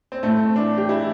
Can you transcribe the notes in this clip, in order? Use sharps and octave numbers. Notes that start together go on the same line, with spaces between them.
C4
A2 A3
E3 D4
G4
E3 E4